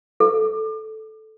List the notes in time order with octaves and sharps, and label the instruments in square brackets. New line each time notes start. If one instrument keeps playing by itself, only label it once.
[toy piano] A4